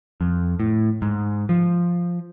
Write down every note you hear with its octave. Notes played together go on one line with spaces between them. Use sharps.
F2
A2
G#2
F3